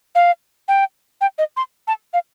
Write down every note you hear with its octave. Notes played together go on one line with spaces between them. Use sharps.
F5
G5
G5
D#5
C6
A5
F5